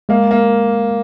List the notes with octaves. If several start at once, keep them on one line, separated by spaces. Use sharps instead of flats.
G#3 A#3
A#3